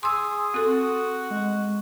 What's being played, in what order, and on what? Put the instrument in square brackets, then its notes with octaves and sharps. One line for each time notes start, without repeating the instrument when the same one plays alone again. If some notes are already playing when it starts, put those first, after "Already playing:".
[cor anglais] G#4 [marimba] C6 E6 [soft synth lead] D#6
[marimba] C4 A4 [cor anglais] F#4
[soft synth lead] G#3